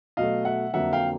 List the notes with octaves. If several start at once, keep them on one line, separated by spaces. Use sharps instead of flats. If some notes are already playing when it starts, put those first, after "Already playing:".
B2 F#3 A3 D#5 F5
E5 F#5
F2 D3 F#3 A#3 E5 F#5
F5 G5